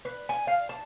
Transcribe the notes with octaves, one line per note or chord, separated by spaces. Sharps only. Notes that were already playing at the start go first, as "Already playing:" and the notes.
B4
G#5
F5
A5